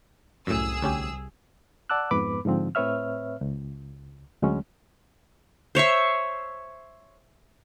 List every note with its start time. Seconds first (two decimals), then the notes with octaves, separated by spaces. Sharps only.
0.47 C2 F#2 A2 G#4 E6
0.82 D2 C#4 G4
1.90 D5 F#5 A5 D6 E6 F#6
2.11 F2 G#2 B3 B4 B5 D6
2.45 G#2 D3 F3 C4
2.75 A2 C4 B4 C#5 E5 F6
3.41 C#2
4.42 D2 F#3 G#3 C#4
5.75 C5 C#5 E5 C#6